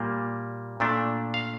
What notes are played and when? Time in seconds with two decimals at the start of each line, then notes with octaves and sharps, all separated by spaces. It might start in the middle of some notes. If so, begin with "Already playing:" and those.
Already playing: A#2 G3 A#3
0.80 A#2 A3 D4
1.34 F5